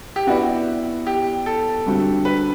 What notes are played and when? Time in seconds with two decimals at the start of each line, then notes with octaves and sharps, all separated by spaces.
0.16 G4
0.27 B3 E4 F#4 B4 D5
1.07 G4
1.46 A4
1.86 D3 G3 C4 F#4
2.25 B4